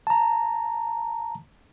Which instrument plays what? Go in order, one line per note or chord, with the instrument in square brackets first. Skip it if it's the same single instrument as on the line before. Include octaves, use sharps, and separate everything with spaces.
[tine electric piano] A5 A#5